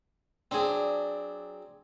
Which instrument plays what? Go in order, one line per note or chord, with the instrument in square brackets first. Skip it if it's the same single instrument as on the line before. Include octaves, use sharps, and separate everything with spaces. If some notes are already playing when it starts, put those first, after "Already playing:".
[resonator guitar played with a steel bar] F#3 D4 [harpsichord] C4 G#4